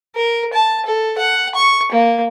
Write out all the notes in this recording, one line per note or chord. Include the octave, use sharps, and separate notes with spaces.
A#4
A5
A4
F#5
C#6
A#3